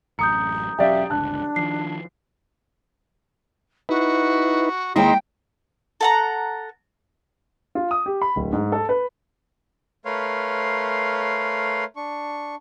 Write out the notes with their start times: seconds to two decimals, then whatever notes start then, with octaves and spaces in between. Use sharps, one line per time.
0.19 A1 F#2 A#5 D#6 G6 C#7
0.79 E1 F#3 C#4 G4 D5 E5 F5
1.10 G1 C#2 D4 A5 F#6
1.56 D#3 F3 C7
3.89 D#4 E4 F#4 B4
4.96 D#2 G#3 E4 D#5 G5 A#5 C6
6.01 A4 F#5 A#5
7.75 F4
7.91 D#6
8.06 G4
8.21 B5
8.36 D1
8.53 G#2
8.72 A4
8.89 B4
10.05 A3 A#4 B4 C#5 F5 C6
11.96 D4 C#6